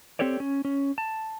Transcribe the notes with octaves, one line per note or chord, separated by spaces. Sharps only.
C4 G4 A4 C#5 D5
C#4
C#4
A5